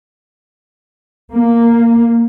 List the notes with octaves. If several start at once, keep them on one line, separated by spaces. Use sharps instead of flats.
A#3